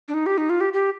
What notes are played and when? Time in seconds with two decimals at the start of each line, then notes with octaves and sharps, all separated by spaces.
0.08 D4
0.14 D#4
0.26 G4
0.38 D#4
0.50 F4
0.61 G4
0.73 G4